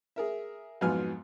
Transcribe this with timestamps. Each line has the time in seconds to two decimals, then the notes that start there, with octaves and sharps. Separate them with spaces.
0.16 G#4 A#4 E5
0.81 F2 G#2 F#3 B3 G#5 F6